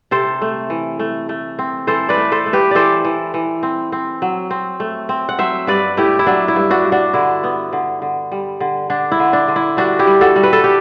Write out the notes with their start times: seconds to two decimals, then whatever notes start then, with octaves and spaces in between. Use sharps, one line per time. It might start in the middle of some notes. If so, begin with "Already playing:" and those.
0.11 C3 A4 C5
0.42 A3
0.70 E3
0.99 A3
1.29 A3
1.59 C4
1.87 E3 A4 C5
2.09 B4 D5
2.17 A3
2.32 A4 C5
2.46 A3
2.53 G4 B4
2.71 E3 A4 C5 D5
3.05 E3
3.34 E3
3.63 C4
3.92 C4
4.22 F#3
4.51 C4
4.80 A3
5.09 C4
5.29 F#5
5.39 F#3 C5 E5
5.67 G2 B4 D5
5.97 A3 E4 G4
6.19 E4
6.27 F#3 D4
6.48 E4
6.56 G2
6.70 D4 F#4
6.85 G2
6.92 D4 F#4
7.14 D3 E4
7.44 B3
7.73 D3
8.02 D3
8.32 G3
8.60 D3
8.90 D3 D4
9.12 E4
9.20 D3
9.33 D4
9.48 D3
9.56 E4
9.77 G3 D4 F#4
9.99 E4 G4
10.07 G3
10.21 F#4 A4
10.36 G3
10.43 B4
10.53 A4
10.64 G4